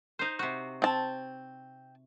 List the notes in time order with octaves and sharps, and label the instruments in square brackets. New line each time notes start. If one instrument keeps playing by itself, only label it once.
[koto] D#4 C5
C3 F#4
[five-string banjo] C4 A5